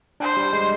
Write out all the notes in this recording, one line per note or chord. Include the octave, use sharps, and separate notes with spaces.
D4 C5
G3
G#3